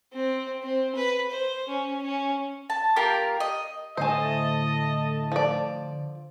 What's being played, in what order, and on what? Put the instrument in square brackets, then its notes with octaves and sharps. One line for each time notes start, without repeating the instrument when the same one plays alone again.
[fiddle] C4
C4
B4
C5
C#4
C#4
[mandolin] A5
A#3 F4 G4 A#4
D#5
[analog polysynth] A2 A3 A5 [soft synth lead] D3 [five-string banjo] C5 G#5 [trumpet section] D#5
[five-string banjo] F3 D5